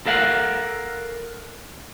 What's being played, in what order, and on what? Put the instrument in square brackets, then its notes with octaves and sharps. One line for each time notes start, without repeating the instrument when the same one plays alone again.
[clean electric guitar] A4 A#4 F5 F#5